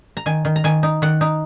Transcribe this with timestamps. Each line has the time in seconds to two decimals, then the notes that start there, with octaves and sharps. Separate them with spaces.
0.17 A#5
0.26 D#3 G#5
0.45 D#3
0.56 A#5
0.64 D#3 G#5
0.83 D#4
1.02 D#3 F#5
1.21 D#4